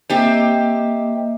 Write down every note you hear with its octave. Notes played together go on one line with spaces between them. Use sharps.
A#3 C4 G4 D#5 E5